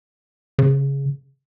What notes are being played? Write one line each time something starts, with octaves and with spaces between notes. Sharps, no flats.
C#3